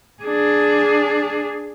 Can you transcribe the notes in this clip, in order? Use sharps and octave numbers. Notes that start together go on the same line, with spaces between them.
D4 G#4